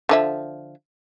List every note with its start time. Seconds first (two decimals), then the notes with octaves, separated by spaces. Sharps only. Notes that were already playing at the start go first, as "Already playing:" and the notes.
0.09 D3 F3 E5